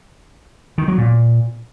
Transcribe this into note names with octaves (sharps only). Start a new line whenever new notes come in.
D#3
F#3
A#2